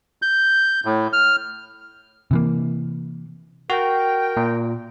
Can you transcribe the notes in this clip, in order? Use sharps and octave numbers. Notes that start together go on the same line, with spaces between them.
G6
A2
F6
C3 E3 A#3
F#4 A#4 G5
A#2